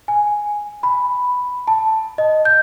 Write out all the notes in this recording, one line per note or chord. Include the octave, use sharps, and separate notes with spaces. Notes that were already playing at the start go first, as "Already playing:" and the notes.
G#5
B5
A5
D#5
G6